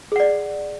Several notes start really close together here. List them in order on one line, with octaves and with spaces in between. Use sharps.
G#4 F#5 D5